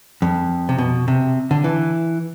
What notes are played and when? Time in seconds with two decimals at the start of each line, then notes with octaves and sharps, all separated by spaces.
0.22 F2
0.69 C3
0.78 B2
1.08 C3
1.51 D3
1.64 E3